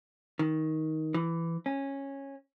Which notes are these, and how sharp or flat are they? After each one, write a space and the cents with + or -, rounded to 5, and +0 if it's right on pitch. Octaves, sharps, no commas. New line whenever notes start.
D#3 +15
E3 +15
C#4 -10